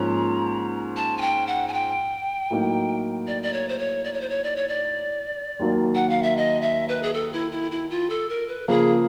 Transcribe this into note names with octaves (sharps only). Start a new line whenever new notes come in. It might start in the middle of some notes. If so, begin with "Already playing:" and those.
Already playing: G#2 F3 A#3 C#4 A#5
A5
G#5
G5
F#5
G#5
G5
A2 F#3 A#3 D#4
D5
D5
C#5
C5
C#5
D5
C#5
C5
C#5
D5
C#5
D5
D#2 D#3 F#3 A#3
F#5
F5
E5
D#5
E5
B4
G#4
A4
E4
E4
E4
F4
A4
A#4
B4
C#3 F3 A#3 G#4